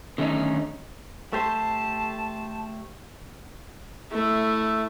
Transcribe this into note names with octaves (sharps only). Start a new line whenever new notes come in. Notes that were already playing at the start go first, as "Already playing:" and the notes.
D3 D#3 A3 C#4 D#4
A3 G4 C5 A5
A3 E4